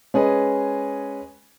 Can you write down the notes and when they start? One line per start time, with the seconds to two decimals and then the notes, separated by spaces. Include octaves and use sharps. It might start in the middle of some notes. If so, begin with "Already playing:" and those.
0.14 G#3 C#4 G#4 B4 D#5